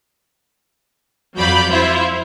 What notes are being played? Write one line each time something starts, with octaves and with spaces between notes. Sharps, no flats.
F2 F#3 D5 F5 B5 G6
E4 F4 C5 E5